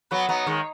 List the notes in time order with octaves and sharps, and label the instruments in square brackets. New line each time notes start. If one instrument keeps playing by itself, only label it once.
[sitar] F#3 B3 [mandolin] B4
[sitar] F#3 B3 [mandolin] D#4
[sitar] D#3 G#3 [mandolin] C#5